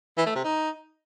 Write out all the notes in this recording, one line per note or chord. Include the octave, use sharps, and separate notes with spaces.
E3
A3
C3
D#4